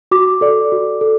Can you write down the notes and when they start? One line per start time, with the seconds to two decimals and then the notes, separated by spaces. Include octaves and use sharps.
0.11 F#4 D6
0.41 A4 D5
0.72 F#4
1.01 A4